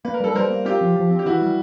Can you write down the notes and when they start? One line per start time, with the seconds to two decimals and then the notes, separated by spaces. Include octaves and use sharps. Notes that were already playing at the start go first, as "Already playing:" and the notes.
0.05 A#3 B4
0.14 A#4
0.20 G3 A4 B4
0.35 G3 A#4 C5
0.50 A#3
0.65 C4 F4 G4
0.81 F3
0.96 F3
1.11 C4
1.19 G4
1.26 E3 E4 F#4
1.41 G3